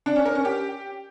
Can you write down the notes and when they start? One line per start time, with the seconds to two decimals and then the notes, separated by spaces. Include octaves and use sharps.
0.06 D4
0.16 C#4
0.25 A#4
0.35 C#4
0.45 G4